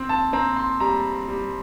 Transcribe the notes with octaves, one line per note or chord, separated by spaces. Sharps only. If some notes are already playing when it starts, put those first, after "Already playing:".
Already playing: C4
A5
C4 A#5
C6
G3 A#5
G3